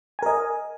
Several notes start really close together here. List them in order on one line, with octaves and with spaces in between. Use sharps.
G#5 A#4 D#5